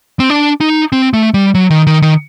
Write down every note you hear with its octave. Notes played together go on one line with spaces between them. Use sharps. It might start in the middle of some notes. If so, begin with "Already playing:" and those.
C4
D4
D#4
C4
A3
G3
F#3
D#3
D#3
D#3